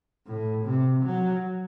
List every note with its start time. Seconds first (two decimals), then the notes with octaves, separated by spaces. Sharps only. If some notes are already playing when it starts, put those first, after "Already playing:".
0.27 A2
0.65 C3
1.04 F#3